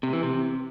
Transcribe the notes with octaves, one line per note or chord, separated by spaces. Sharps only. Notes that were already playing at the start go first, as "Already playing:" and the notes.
C3
E3
C3